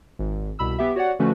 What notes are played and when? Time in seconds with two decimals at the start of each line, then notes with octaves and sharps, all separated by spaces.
0.19 G#1
0.59 C2 B2 B5 E6
0.78 B3 G4 E5
0.96 F#4 C#5 D5 F#5
1.19 D3 F3 A3 C#4 F#4 B4